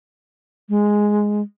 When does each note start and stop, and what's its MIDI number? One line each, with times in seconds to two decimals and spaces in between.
0.69 1.41 56